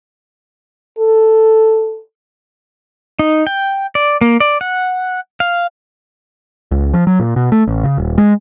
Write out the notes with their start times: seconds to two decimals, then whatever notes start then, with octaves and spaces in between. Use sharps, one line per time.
0.99 A4
3.19 D#4
3.47 G5
3.95 D5
4.21 A#3
4.40 D5
4.61 F#5
5.40 F5
6.71 C#2
6.93 F3
7.07 F#3
7.20 A#2
7.36 B2
7.52 A3
7.68 A1
7.84 C#3
7.98 D#1
8.18 G#3